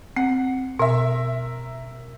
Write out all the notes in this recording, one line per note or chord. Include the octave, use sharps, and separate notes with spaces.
C4 F#5
B2 A#4 E5